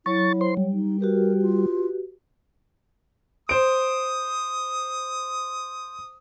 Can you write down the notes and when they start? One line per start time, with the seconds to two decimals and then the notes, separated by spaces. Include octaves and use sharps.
0.06 F#3 E4 C#5 C#6 A6
0.41 C5 C6
0.57 G3
0.73 D#4
1.01 F#4 G4 A#4 B4
1.42 F4
3.49 C5 D#6 D7